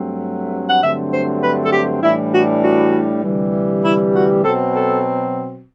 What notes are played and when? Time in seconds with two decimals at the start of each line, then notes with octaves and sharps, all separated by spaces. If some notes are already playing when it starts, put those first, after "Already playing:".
Already playing: G2 F#3 A3 C4
0.69 F#5
0.82 G2 D3 F#3 A3 C4 E5
1.12 C5
1.42 B4
1.64 A4
1.73 G4
2.03 A2 E3 G3 D4 E4
2.33 F#4
2.63 F#4
3.23 D2 C3 E3 G3
3.83 E4
4.13 F#4
4.44 B2 F#3 C4 A4
4.74 A4